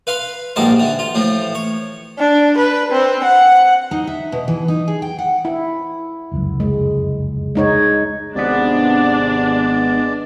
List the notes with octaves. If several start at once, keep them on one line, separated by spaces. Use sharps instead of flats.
B4 F5 B5 C6
A#1 G#2 D#3 G3 A5 C6
D3 E3
F4
A2 E3 F3
C#5
D4
B4
C4
F#5
D#4
E5
B2
E3
D#4
G#4
G5
F#5
E4
F1 C#2 F#2
G#3
G#3 D#4 C#5
G#1 C3 G#3 B3 D4 D5